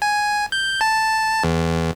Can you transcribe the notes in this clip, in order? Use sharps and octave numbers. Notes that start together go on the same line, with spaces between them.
G#5
G6
A5
E2